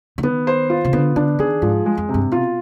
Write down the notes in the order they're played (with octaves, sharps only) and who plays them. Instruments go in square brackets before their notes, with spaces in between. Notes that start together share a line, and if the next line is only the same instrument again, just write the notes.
[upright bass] D3
[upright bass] D#3 [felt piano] B3
[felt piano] C5
F4
[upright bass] C3
[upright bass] D3 [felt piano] B3
[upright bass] D3 [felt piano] D4
[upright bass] D#3 [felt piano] G#4
[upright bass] G#2 [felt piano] F3
[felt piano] G#3
[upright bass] F2
[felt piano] C3
[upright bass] G2
[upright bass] B2 [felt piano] F4